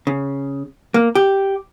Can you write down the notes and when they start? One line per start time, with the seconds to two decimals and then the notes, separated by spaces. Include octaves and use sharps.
0.07 C#3
0.94 A#3
1.15 G4